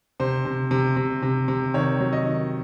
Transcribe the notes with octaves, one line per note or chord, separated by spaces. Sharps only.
C3 C5
C3
C3
C3
C3
C3
D#3 C#5
F#3
D#5
D#3